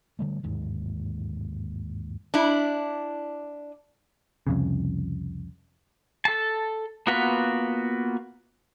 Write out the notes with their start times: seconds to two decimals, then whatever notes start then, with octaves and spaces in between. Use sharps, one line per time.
0.19 D3 G3 A3
0.43 G1 D#2 G#2
2.34 D4 E4
4.47 C2 F2 C#3
6.25 A4 A5
7.07 A#3 B3 F4 F#4 B4